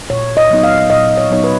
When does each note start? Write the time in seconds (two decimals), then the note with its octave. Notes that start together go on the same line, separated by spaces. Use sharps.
0.10 A#2 C#5
0.37 D#5
0.50 F#3 B3 D#4
0.63 F5
0.90 A#2 D#5
1.17 C#5
1.30 F#3 B3 D#4 C#5
1.44 B4